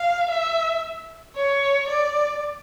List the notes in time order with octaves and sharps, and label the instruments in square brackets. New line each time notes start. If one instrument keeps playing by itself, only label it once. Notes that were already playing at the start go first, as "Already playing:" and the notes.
Already playing: [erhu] F5
E5
C#5
D5